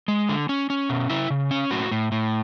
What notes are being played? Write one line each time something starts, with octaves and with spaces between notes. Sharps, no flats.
G#3
D3
C#4
C#4
B2
C#3 E4
C#3
C#4
A2 F#4
A2
A2